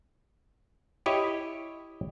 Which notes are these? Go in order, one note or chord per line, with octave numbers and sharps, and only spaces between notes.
E4 G4 C#5 D#5